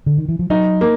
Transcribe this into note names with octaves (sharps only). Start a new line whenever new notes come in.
D3
D#3
E3
F3
F#3 D#4
A#3